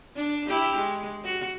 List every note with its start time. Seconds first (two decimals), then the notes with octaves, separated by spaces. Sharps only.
0.16 D4
0.47 E4 G4
0.77 G#3
1.25 F#4